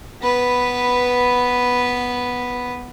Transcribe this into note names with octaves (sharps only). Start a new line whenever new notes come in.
B3 B4